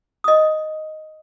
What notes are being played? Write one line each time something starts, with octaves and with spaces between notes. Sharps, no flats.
D#5 D#6